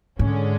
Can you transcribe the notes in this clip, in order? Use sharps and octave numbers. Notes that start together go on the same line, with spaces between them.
G#2 D3 G#3 C#4